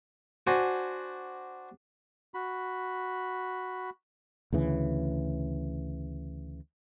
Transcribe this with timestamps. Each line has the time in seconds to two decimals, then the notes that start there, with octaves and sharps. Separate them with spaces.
0.47 D4 F#4 C5 F#5 G#5
2.34 F#4 B5
4.53 D2 C#3 E3